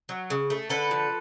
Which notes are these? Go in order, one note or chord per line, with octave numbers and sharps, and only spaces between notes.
F#3
C#3
A3
D3 A4 B4
F3